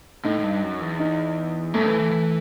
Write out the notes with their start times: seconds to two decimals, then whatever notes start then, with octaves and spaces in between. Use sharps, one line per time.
0.25 A2 D#4
0.39 A2
0.43 G2
0.62 F#2
0.81 E2
0.99 D#4
1.74 F#2 A3
1.86 E3
1.99 E3
2.11 E3